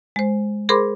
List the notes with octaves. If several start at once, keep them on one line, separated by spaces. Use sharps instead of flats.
G#3 C5
G#4 A#4 C5 B5 C6 D6